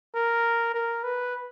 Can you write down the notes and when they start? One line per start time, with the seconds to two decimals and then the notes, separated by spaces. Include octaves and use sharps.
0.15 A#4
0.74 A#4
1.04 B4